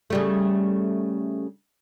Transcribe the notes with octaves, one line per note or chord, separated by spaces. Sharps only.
C#3 G3 A3